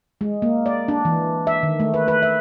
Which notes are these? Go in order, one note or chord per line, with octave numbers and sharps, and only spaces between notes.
G#3
A#3
D5
D4
E3
E5
D#3
A3
B4
B4
E5